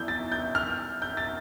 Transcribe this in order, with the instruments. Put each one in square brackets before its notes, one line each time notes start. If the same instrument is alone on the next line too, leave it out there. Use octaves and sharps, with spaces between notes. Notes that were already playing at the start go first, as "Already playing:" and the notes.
Already playing: [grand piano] E3 B3 E4 A4 D5 [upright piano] G6
[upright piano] A6
G6
F6
G6
A6